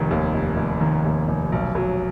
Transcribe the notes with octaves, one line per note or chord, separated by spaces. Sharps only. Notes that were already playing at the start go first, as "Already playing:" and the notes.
Already playing: F1 D#3
D#2
F1
F1
D#3
D#2
F1
B1
F#3